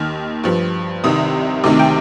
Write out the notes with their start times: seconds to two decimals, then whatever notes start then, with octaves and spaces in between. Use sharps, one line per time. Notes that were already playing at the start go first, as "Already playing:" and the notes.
Already playing: D#2 D#3 F6
0.44 G2 F3
1.04 C2 C3 D#3 D#6
1.64 D2 C3 D#3 D6
1.79 G5